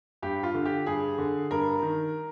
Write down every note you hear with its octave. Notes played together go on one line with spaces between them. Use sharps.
G2 G4
F4
D3
G4
G2 G#4
D3
G2 A#4
D#3